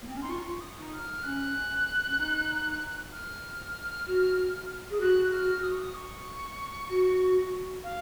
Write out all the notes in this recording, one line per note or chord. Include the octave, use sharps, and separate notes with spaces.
A#3
C4
C#4
D#4 C6
F4 C#6
C#6
D#6
D#4
F6
C#4 F#6
C#4
D#4
F6
F#4
G#4
F#4 F#6
F#6
F6
D#6
C#6
D#6
C#6
F#4
F5